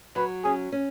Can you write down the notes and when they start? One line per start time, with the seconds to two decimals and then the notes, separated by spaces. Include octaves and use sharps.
0.16 F#3 B4
0.44 C#4 G#4
0.72 C#4